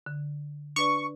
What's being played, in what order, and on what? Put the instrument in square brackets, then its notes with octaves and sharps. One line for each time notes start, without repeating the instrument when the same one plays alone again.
[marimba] D3
[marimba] D4 B4 D5 [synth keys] C#6